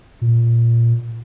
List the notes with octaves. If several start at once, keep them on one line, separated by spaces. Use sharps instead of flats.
A#2